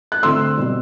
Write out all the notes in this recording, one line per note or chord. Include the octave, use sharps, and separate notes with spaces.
F#6
D3 A3 C4 C6 E6
B2 G3 C4